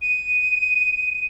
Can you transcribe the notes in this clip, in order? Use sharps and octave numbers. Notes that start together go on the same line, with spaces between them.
D#7